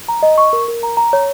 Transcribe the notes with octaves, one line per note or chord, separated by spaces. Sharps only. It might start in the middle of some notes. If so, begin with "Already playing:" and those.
A#5
D#5
C#6
A#4
A#4
A#5
A#5
C#5